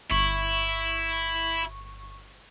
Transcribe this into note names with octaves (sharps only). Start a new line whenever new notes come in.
G1 E4 C#6